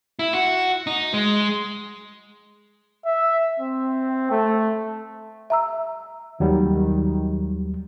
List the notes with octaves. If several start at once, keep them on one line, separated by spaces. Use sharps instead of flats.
E4
F#4
D#4
G#3
E5
C4
A3
E5 A#5 E6
D#2 D#3 F#3 G3